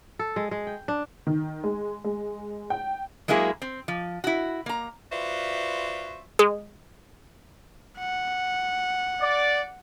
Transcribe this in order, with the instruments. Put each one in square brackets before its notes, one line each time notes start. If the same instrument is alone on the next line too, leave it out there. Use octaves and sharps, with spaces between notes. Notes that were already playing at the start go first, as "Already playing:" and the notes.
[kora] A4
G#3
G#3
G5
D4
[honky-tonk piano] D#3
G#3
G#3
G5
[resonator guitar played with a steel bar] F#3 G#3 A#3 E4 G#4
C4
F3
E4 F#4
A#3 A#5
[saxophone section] F4 F#4 B4 C5 D5 E5
[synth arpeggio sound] G#3
[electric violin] F#5
[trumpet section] D5